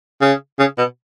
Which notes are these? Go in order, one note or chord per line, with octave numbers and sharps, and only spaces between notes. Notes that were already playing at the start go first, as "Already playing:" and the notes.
C#3
C#3
B2